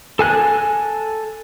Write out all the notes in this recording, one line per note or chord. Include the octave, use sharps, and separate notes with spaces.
A4 G#5 F#6